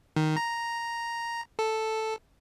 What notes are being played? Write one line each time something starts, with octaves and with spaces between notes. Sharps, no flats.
D#3
A#5
A4